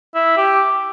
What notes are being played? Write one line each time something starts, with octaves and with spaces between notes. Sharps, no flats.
E4
G4